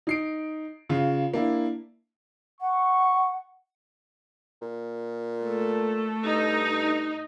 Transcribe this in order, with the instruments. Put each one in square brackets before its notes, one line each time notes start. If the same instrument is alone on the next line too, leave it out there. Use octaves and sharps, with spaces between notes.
[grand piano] D#4 C7 D7
C#3 F4
A#3 D4 E4
[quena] F#5 [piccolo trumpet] C#6
[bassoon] A#2
[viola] A3 A4
[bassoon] G2 [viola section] D#4